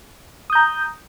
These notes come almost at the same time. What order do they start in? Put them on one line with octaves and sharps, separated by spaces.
D#6 G6 A#5